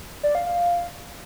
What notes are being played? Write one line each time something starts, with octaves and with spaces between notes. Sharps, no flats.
D5
F5
F5